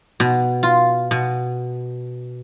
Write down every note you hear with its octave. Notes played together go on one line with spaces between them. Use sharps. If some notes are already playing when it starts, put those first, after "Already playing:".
B2
F4
B2